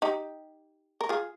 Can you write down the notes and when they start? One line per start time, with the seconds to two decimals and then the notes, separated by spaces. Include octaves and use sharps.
0.02 D#4 G4
1.01 A#4
1.09 F4 G#4